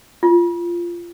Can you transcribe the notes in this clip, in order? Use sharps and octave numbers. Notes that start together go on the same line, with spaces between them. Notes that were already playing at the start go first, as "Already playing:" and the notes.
F4